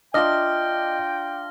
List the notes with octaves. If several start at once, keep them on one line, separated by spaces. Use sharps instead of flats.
D4 F4 D#5 E5 G5 F6 A#6